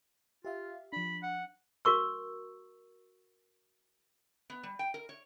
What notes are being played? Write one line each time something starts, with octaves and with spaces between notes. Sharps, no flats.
F4 G4 E5 F5
F3 D4 B5
F#5
F#4 A#4 C#6 E6
B3
G3
G5
A#4
C#5